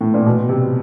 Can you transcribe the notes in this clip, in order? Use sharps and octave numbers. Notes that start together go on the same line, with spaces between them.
A2
A#2
B2
C3